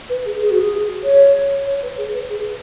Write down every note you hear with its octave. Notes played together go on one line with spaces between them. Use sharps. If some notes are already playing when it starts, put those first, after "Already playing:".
B4
G#4
G#4
F#4
G#4
C#5
C#5
B4
G#4
B4
G#4